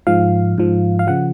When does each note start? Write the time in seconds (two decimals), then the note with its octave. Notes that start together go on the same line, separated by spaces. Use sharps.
0.07 G#2 F3 F5
0.58 G#2 F3
0.99 F5
1.07 C#3 F3 F#5